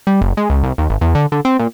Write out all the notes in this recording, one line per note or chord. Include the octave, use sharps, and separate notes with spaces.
G3
F#1
G#3
C#2
C2
D#2
G#1
E2
D3
D3
C4
A#2